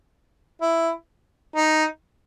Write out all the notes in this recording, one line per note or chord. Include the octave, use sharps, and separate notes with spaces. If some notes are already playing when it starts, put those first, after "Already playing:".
E4
D#4